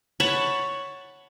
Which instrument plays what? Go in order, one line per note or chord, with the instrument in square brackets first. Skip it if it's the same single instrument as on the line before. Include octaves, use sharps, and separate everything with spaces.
[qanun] C#5 F#5 A5 B5